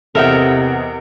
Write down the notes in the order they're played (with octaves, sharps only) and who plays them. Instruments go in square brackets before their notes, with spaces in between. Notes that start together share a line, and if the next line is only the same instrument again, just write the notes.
[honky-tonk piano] E2 D#5 F#5 [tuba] C3 [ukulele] A4 E5 [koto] A#4 G5